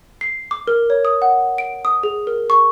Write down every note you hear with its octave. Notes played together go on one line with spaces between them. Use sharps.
C7
D6
A#4
C#5
D#6
F#5
D7
D#6
G#4
A#4
C#6